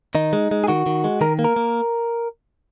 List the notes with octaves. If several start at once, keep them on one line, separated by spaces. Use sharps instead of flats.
D#3 D#4
G#3
G#3
G#4
D#3 F#4
D#3
G#3
D#3 A#4
A#3
A#4
A#3